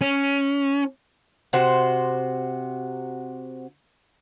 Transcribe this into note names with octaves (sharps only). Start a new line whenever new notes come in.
C#4
C3 F#4 C5